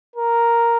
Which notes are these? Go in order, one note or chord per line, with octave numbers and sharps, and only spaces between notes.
A#4